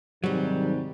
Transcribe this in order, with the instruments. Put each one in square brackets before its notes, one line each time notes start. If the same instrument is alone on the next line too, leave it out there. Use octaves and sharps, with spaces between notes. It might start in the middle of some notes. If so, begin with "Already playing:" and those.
[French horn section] G#2 C3 D#3 [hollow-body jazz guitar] F#3 G3